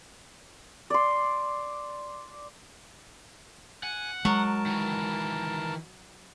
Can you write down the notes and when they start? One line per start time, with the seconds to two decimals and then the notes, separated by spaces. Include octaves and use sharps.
0.90 D5 C6
3.83 F#5 G#5
4.25 F#3 G#3 A#4 A5
4.66 D#3 E3